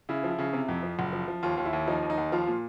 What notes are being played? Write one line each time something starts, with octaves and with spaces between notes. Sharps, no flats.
C#3 E4
F3
E4
C#3
C3
F2
F3
F#1
F3
F3
D#2 F4
D#2
E4
D#2
F3 D#4
D#2
D#4
D#2
F3 F4
A#2